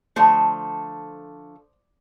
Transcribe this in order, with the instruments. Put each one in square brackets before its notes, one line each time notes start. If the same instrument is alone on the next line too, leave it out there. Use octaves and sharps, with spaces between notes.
[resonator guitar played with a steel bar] D3 F3 A3 C5